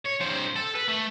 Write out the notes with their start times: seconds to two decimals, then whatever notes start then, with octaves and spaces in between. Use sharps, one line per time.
0.06 C#5
0.21 G2 C5
0.56 A4
0.75 B4
0.88 A3